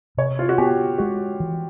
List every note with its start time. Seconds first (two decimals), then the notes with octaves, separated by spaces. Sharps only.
0.17 C3 C#5
0.39 F4
0.49 F#4
0.58 B3 G4
0.98 G#3 F#4
1.40 E3